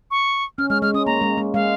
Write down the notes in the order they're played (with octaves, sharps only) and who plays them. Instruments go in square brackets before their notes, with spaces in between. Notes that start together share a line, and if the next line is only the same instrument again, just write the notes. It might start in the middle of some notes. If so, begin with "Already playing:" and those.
[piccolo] C#6
[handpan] C#4 [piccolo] F6
[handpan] G#3 [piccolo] F6
[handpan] G#3 [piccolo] F6
[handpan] C#4 [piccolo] D#6
[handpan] A#3 [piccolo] A#5
[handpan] G#3
G#3
[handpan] G#3 [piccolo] F5